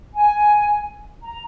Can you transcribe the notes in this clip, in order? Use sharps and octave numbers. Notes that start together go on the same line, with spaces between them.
G#5
A#5